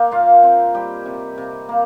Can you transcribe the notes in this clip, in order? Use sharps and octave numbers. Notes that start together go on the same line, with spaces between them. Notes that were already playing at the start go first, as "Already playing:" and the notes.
Already playing: A#3 D#4 A#4
A#2 F4 F5
C4
G3 G4 G5
C3
C3
A#3